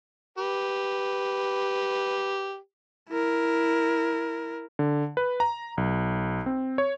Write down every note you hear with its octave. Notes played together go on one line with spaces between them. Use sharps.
G4 B4
E4 A#4
D3
B4
A#5
B1
C4
C#5